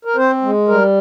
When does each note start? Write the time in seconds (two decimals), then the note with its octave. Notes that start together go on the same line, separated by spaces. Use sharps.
0.05 A#4
0.16 C4 C5
0.42 G#3
0.68 G3 A#4